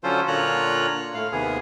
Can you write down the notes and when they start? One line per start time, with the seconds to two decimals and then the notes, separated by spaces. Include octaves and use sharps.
0.04 D3 F#3 C#4 F4 A4 C5
0.28 A#2 D3 F4 C#5 A#5 F#6
1.15 A2 F5
1.32 D#2 C3 B3 G#4